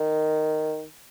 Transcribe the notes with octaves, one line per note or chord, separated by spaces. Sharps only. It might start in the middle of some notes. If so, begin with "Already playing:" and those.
Already playing: D#3